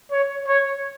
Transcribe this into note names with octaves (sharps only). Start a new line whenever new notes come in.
C#5
C#5